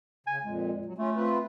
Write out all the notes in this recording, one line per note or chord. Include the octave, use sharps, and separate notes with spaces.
C#3 G#5
F2 A#2 G#3
F#3
A3 C#4 F4
C4 F4 B4